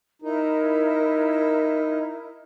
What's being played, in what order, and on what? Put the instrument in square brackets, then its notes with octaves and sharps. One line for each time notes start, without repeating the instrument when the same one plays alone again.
[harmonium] D#4 [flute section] E4 A#4